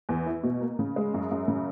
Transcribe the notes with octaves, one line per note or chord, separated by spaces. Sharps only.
E2
E4
B2
A#3
C#3
G#3
F#2
F#2
C#3